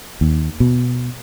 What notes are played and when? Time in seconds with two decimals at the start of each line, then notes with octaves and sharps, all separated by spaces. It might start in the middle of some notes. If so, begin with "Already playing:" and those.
0.21 D#2
0.60 B2